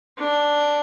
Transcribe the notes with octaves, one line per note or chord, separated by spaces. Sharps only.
D4